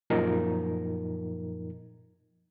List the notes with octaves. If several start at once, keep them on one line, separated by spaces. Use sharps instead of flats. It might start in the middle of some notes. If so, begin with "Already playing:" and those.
F#2 A#2 F3 D#4 A#4